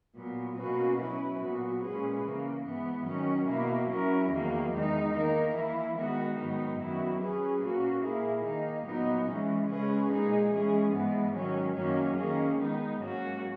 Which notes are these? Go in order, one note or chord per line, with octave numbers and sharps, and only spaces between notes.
A#2 F#3 B3
B2 A#3 C#4 F#4 B4
F#3 C#4 E4 B4
A#2 F#3 B3 F#4
A#2 G#3 C#4 G#4 B4
C#3 E3 A#3
G#2 E3 B3
D#3 F#3 C#4
B2 A#3 E4
F#3 C#4 E4 A#4
E2 D#3 F#3 A#3
E2 D#3 G#3 D#4
D#3 A#3 D#4 A#4
E3 A#3 E4
D#3 G#3 B3 F#4
G#2 D#3 F#3 B3 D#4
F#2 D#3 F#3 B3 E4
F#3 C#4 G#4 B4
A#2 A#3 C#4 F#4
A#2 A#3 E4 G#4
D#3 A#3 D#4
A#2 F#3 B3 D#4
E3 G#3 C#4
C#3 G#3 C#4 G#4 B4
A#2 G#3 D#4 G#4
E3 G#3 C#4 G#4
G#2 E3 G#3 B3
D#3 F#3 C#4
F#2 D#3 F#3 A#3 C#4
D#3 A#3 C#4 G#4
D#3 G#3 B3 D#4
G#2 F#3 A#3 C#4 F#4